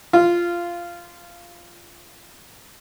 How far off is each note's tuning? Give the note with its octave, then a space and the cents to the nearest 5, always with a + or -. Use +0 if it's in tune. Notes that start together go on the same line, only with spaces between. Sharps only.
F4 -10